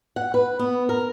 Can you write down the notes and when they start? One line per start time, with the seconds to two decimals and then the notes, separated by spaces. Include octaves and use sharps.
0.16 F#5
0.34 B4
0.59 B3
0.89 A#4